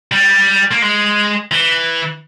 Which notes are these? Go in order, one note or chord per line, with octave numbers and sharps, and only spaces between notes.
G3
A#3
G#3
E3